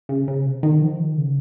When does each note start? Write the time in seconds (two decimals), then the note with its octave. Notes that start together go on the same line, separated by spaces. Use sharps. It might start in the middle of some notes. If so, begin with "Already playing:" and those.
0.09 C#3
0.28 C#3
0.46 C3
0.63 D#3
0.81 F3
1.00 D#3
1.17 C#3